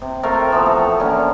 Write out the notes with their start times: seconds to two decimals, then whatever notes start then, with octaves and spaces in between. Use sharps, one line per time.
0.02 C3
0.23 C3 A3 F4 A#4
0.50 E3 F3 B3
0.66 C3 A3
1.00 D3 A#3 C#4